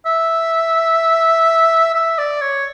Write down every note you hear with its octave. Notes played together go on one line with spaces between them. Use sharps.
E5
E5
D5
C#5